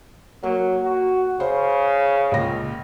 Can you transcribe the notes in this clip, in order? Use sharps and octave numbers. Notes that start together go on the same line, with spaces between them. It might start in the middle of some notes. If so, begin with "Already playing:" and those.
F#3 A#3
F#4
C#3 C5
C#2 A#2 A#6